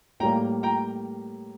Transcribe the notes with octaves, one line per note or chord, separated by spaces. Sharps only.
A2 G3 A#3 G5 A#5
G5 A#5